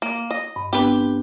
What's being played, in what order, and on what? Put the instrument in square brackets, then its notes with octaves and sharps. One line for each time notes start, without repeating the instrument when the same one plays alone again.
[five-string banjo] A#3
D#5
[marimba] G2
[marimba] B3 C4 D4 [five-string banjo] G4 B4